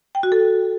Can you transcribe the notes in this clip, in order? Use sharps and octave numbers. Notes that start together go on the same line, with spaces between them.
G5
F#4
A4